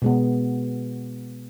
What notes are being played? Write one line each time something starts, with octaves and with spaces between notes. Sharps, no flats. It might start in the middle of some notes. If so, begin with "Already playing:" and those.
B2 G#3 B3